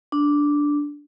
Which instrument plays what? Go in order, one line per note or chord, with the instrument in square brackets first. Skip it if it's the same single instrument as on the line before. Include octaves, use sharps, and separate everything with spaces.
[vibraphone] D4